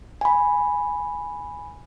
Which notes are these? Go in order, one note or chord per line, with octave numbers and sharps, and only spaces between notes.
G#5 B5